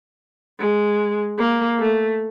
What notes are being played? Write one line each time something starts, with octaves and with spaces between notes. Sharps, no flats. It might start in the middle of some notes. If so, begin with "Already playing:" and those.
G#3
A#3
A3